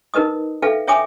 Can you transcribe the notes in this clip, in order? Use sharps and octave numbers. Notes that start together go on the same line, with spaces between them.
D#4 A#4 B4 D#5 D#6
A4 B4 E5 F5 G5
C#5 E5 G5 G#5 D6 D#6